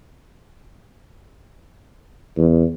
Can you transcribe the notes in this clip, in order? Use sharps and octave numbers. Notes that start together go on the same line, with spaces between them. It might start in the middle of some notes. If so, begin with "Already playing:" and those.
E2